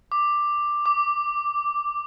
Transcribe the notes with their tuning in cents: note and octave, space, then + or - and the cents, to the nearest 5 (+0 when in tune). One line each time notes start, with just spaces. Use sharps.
D6 +10
D6 -5